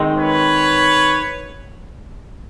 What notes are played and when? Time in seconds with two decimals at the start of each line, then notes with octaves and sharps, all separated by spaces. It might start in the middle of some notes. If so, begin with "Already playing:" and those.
Already playing: D#3 G#3 C4 D#4
0.16 B4 C#5